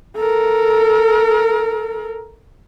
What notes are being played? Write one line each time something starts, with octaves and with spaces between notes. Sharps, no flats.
A4 A#4